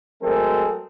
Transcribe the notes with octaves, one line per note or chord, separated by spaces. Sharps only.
F#3 G#3 A3 C4 A4 A#4